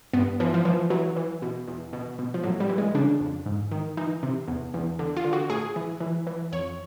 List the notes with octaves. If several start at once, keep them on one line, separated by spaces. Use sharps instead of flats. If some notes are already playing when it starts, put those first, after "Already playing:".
G2 B3
E3 F3
F3
E3 F3
E3 F#3
E3
B2
E2
B2
B2
F3
A2 F#3
G3
E3
G#3
C#3 D4
F2
G#2
D#3
E3 D#4
C3
E2
E2
D3
F4
D3
F#4
A2 G#4
E3
E3
E3
F2 C#5